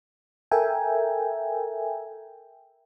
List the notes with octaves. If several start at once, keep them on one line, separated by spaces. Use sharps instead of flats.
A4 A#4 E5 G5 G#5